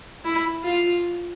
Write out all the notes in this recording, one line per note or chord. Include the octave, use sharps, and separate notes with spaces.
E4
F4